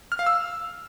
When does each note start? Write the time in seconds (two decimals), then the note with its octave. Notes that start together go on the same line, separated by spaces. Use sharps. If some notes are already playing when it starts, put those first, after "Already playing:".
0.12 F6
0.19 F5
0.26 E6